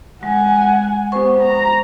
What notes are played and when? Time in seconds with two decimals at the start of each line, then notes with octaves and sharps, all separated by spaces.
0.23 G#3 F#5 G#5
1.12 B3 G4 C5 C#6
1.42 A#5